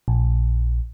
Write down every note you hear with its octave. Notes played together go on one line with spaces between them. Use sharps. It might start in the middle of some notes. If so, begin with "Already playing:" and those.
A#1